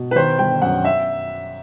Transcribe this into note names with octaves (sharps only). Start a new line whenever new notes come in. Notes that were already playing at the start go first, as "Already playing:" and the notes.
Already playing: B2
B4
D#3 C5
G1 G5
F#2 F#5
E5